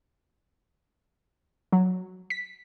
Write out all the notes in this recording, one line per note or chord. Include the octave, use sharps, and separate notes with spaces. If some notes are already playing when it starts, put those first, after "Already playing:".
F#3
B6